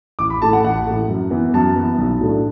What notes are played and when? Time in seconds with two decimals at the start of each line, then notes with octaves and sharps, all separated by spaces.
0.19 A1 D6
0.30 B5
0.42 A2 A3 A5
0.53 F#5
0.64 A1 F#5
0.86 A2 A3
1.08 F#2
1.31 E3 B3
1.54 F#2 A5
1.76 E3 B3
1.98 B1
2.21 A2 F#3 A3 D4